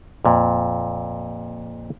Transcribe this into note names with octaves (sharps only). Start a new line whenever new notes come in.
F2 A#2